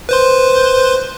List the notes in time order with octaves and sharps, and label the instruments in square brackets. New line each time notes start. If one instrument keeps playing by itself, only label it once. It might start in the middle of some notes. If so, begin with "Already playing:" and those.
[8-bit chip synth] B4 C5 C6